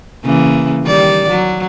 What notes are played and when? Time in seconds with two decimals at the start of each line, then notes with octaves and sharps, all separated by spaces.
0.24 C#3 E3 A#3
0.84 D#3 G3 D5
1.29 F#3